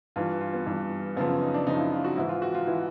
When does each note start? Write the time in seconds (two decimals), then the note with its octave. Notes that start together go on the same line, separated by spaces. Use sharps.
0.16 G2 E3 F4
0.41 F4
0.53 B3
0.66 G2 E3
1.17 F#2 C#3 F3 B3
1.29 C#4
1.41 D#4
1.54 D4
1.67 F#2 C#3 F3 D#4
1.80 E4
1.92 F4
2.04 F#4
2.17 G#2 E3 E4
2.29 F4
2.42 F#4
2.55 F4
2.67 E3 E4